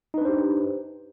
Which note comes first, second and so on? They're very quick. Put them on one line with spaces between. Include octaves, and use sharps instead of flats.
D#4 B4 D4 C5 G4